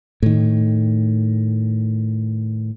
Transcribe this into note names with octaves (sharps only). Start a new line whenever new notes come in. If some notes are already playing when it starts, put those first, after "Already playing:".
A2 D#3